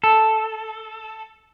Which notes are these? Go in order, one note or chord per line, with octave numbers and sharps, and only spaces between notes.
A4